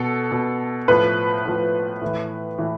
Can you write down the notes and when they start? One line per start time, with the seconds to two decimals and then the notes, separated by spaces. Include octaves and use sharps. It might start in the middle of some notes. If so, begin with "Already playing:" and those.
Already playing: B2 A4
0.32 B2
0.88 A2 F3 B4
1.45 A2 F3
2.01 A2 E3
2.58 A2 E3